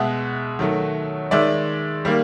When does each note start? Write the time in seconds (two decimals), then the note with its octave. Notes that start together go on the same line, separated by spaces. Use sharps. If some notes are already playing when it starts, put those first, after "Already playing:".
Already playing: B2 G#3 E5 F#5
0.59 D#3 F#3 A3
1.31 D#3 G#3 D5 E5
2.05 D#3 G3 A#3